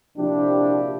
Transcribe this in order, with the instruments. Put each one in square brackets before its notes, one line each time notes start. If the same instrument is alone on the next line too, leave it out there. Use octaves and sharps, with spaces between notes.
[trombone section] A#1 C3 F3 D4 E4 G4